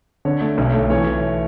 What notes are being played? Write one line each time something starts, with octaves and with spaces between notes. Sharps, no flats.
D3 C#5
A3
B1
A3
E3 C#5
E3